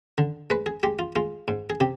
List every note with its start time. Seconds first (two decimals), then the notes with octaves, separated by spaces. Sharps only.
0.18 D3
0.50 G#3 B4
0.66 G#4
0.83 G#3 G4
0.99 F4
1.16 G#3 F4
1.48 G#2
1.70 G#4
1.80 C3 G4